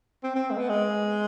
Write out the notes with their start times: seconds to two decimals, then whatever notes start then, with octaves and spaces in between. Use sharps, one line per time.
0.23 C4
0.35 C4
0.51 G#3
0.57 B3
0.69 G#3